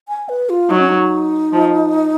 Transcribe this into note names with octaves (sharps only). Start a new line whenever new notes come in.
G#5
B4
F4
F#3 D#4
C#4
D#4
F3